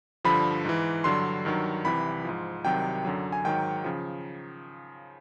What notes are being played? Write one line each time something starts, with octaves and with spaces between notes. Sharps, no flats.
G2 D3 F3 B5
G#2 E3
G2 D3 F#3 C6
G2 D#3 F#3
C2 C3 E3 B5
G#2 F3
C2 C3 D#3 F#3 G5
F#2 D3 F#3
G#5
G#2 D#3 F#3 G5
C#3 F3